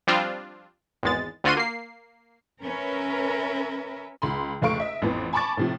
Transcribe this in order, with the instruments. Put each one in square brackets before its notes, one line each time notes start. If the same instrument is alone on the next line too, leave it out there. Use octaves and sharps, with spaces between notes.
[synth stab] F3 G3 C4 D4 F4
G#1 E2 G#3 A6
D2 D3 F4 F#4 C6 D#7
A#3 C7
[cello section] C#4 A#4 B4 E5
[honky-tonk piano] C#2 B5 C6
F1 C#2 A3 F5 C#6 D7
D#5 E5
A1 F2 E3 B3
G#5 A5 B5 C#6 D6 A6
A2 C3 F3